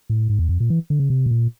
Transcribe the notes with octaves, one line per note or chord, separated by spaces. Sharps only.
A2
G#2
E2
F2
A#2
E3
D3
C#3
C3
B2
A#2